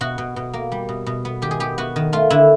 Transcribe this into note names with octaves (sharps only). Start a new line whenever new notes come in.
B2 F#4
B2
B2
A#3
G3
B2
B2
B3
D#3 G4
G#4
B3 G4
B3 F#4
D#3
A3 F4
D3 E4